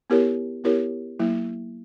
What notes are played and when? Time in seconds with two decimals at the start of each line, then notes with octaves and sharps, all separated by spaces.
0.10 B3 E4 G4 A#4 C#5
0.64 B3 E4 G4 A#4 C#5
1.19 F#3 A#3 E4